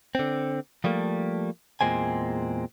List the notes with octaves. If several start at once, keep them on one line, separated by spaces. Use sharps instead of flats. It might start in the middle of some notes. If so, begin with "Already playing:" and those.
D3 C4
F3 G3 A3 A#3
E2 A#2 G#3 C4 G#5